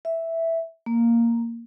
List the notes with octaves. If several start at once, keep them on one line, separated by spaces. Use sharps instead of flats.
E5
A#3